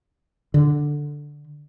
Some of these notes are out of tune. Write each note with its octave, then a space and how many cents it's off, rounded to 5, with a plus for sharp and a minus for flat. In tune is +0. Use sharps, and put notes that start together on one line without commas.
D3 +0